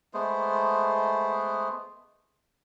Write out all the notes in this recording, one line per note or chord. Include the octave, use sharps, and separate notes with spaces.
G#3 A3 B3 C5